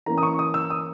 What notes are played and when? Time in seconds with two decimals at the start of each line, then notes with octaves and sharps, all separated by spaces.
0.06 E3 A#3 C#4 A#5
0.18 D#6
0.23 C#6
0.39 D#6
0.54 E6
0.70 D#6